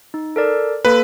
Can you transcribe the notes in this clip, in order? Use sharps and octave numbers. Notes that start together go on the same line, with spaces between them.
D#4
A4 A#4 D5
A#3 A4 B4